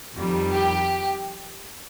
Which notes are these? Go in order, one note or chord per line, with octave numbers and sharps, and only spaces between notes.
F2 D#3 G3
G4